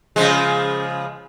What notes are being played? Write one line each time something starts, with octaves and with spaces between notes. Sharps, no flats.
C#3 F3 G#3